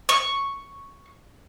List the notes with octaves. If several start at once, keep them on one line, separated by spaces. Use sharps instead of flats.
C#6